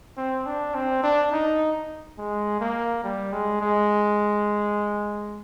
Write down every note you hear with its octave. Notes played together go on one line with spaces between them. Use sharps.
C4
D4
C4
D4
D#4
G#3
A#3
G3
G#3
G#3